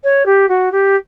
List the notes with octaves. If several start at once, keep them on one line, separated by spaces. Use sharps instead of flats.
C#5
G4
F#4
G4